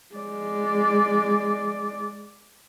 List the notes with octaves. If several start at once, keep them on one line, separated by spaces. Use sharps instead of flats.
G#3 D5